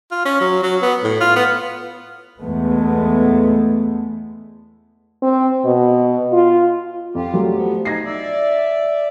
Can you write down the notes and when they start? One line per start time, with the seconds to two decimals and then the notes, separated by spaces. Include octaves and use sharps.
0.11 F4
0.25 C#4
0.41 F#3
0.63 F#3
0.82 B3
1.03 A2
1.20 F4
1.36 B3
2.40 E2 G#3 A3 B3
5.22 C4
5.65 B2
6.33 F4
7.15 F2 F4 G4
7.34 F#3 G3 A3
7.54 F3 B3
7.85 D#4 G#6 A#6 C7
8.05 D5 E5